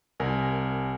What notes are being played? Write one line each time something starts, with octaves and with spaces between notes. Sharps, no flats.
C2 A#4 G#5